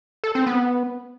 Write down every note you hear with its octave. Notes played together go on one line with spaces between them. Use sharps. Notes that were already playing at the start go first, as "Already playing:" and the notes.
A4
C4
B3